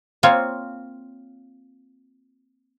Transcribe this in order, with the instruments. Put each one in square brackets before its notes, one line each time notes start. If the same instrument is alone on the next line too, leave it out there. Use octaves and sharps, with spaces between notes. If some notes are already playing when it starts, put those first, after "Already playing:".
[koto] A#3 C4 F4 C#5